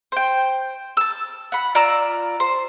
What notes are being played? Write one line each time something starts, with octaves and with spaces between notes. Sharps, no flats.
C5 G5
A5 E6
F#5 B5
F4 D5 A#5 E6
C5